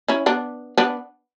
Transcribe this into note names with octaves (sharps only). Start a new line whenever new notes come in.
C#4 E4
B3 D4
B3 D4